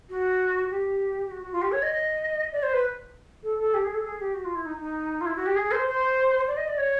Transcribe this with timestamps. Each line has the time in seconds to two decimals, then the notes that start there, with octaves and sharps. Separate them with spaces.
0.10 F#4
0.70 G4
1.26 G4
1.31 F#4
1.42 F#4
1.52 F4
1.62 G4
1.72 C#5
1.82 D#5
2.52 D5
2.63 C5
2.73 B4
3.43 A4
3.58 A4
3.74 G4
3.84 G#4
3.94 A4
4.04 G#4
4.20 G4
4.34 F#4
4.45 F4
4.55 E4
4.65 D#4
4.80 D#4
5.21 F4
5.26 E4
5.36 F#4
5.46 G4
5.56 G#4
5.71 C5
5.87 C5
6.47 D5
6.57 D#5
6.67 D5
6.78 C#5